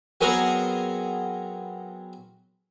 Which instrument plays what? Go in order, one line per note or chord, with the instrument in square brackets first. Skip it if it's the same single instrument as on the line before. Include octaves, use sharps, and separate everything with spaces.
[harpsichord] F#3 B3 C4 G#4 A#4 F#5